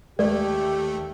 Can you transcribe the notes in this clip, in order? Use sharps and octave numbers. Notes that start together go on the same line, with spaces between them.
D#2 G#3 A3 G4 A4 D5